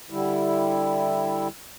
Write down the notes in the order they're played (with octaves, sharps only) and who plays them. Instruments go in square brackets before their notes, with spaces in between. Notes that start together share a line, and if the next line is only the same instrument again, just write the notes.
[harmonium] D3 G3 E4